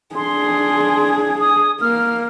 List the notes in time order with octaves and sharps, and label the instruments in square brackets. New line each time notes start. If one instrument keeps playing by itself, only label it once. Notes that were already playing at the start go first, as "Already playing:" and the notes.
[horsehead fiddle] D4 G#4 [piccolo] C6
[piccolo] D#6
[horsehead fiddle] A#3 [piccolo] F6